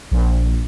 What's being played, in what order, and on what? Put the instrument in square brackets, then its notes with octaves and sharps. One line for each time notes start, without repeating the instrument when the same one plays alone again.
[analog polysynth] A#1